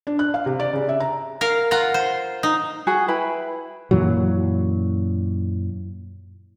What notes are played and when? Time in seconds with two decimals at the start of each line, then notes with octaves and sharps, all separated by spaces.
0.07 D4
0.19 F#6
0.34 F5
0.46 C3
0.60 D5
0.73 C#3
0.89 E5
1.00 A#5
1.41 A#4 F5
1.71 F4 F#5 A#5
1.94 C5
2.43 D#4
2.87 F#4 G#4 G#5
3.08 E4 B4 G5 B5
3.91 F#2 A#2 E3 F#3